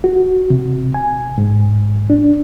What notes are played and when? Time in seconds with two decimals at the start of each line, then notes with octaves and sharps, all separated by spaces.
0.04 F#4
0.50 C3
0.94 G#5
1.38 G#2
2.10 D4